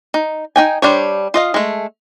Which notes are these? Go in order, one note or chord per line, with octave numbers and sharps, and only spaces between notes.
D#4
D#4 G5 G#5
G3 D4 C5 C#5
F4 D#5 F5
G#3 A3